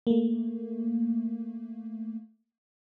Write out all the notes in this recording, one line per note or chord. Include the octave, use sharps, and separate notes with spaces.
A3 A#3